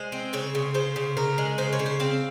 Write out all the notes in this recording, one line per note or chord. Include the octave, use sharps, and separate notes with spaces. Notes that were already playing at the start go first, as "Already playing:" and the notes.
Already playing: G#3 C5
C4
C#3 C#5
C#3
C#3 C5
C#3
C#3 A#4
G#3
C#3 C5
C#5
C#3
C5
C4 F5